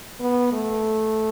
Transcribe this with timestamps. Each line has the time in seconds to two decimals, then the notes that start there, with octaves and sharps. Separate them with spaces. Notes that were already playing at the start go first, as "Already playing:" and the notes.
0.21 B3
0.52 A3